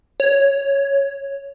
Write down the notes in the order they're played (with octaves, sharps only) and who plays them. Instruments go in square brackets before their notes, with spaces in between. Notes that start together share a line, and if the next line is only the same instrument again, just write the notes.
[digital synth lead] C#5